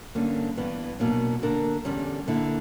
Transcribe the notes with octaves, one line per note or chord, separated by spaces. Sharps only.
G2 D3 A#3 C#4
G2 E3 B3
B2 F#3 A#3 D4
D3 A#3 D4 A#4
E2 D3 G3 C#4
D3 A#3 E4